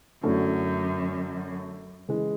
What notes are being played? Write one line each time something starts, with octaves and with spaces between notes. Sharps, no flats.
F#2 D3 F#3 A3 C#4 E4
C#3 E3 G#3